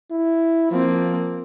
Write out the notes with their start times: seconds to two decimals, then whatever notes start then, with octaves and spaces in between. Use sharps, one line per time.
0.11 E4
0.71 F3 A#3 C4